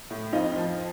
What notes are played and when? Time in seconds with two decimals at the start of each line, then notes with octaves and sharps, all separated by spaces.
0.10 A2
0.33 F2 D#4 F4
0.56 F3